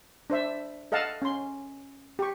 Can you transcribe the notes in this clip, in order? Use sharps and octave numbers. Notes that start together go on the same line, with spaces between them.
D4 C5 E5
A4 D#5 F5 F#5 A5
C#4 C6
G4 C#6